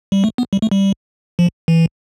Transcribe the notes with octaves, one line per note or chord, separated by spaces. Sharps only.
G3
A3
B3
G3
A3
G3
F3
E3